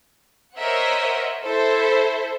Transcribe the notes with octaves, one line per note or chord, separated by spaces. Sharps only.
A#4 C5 C#5 D#5 E5 F#5
E4 A4 C5 E5